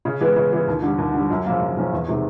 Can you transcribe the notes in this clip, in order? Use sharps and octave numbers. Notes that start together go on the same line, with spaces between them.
C#3
E3 G#3 B3
C#3
E3 G#3 B3
D#2
D3 G3
D#2
D3 G3
F#2
C#3 F3 A#3 C#4
F#2
C#3 F3 A#3 C#4
E2
C3 D#3 G#3